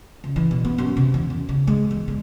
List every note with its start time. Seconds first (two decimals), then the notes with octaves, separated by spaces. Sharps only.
0.24 C#2
0.36 E3
0.51 B2
0.65 B3
0.78 F#2
0.97 C3
1.14 E2
1.30 F#2
1.49 C#3
1.67 G#3
1.91 E2
2.08 D3